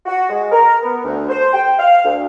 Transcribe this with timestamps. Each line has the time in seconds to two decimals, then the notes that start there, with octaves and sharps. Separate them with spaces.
0.06 F#4
0.29 G#3
0.52 A#4
0.82 B3
1.04 D2
1.29 C5
1.53 G5
1.78 F5
2.04 D2